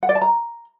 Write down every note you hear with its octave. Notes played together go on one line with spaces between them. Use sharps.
F#5
D5
A5
A#5